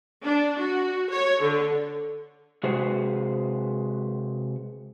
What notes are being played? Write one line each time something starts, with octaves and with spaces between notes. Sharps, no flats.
D4
F#4
C#5
D3
C3 G#3 F#4 G#4 B4 C5